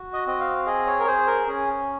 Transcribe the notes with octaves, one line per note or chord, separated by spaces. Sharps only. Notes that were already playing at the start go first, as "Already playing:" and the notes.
Already playing: F#4
D#5
C4 D#5
F5
G#4 D#5
C#5
A#4
G#4 C5
A#4
C#4 G#4